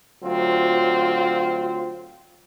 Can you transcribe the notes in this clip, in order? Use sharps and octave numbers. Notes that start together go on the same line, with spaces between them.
D2 F#3 C4 F4